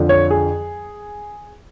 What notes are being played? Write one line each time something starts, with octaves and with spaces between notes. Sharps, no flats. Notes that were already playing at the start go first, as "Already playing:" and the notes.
Already playing: F2 D3 F3
C#5
G#4